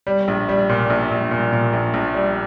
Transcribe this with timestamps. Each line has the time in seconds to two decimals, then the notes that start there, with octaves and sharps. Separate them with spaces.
0.07 G3
0.28 A#1
0.49 G3
0.69 A#2
0.90 A#1
1.11 A#1
1.31 A#2
1.52 A#2
1.73 A#1
1.94 A#1
2.14 G3